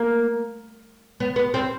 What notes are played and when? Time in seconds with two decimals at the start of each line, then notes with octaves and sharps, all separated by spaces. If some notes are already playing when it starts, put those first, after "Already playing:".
Already playing: A#3
1.20 B3
1.36 B3
1.54 C4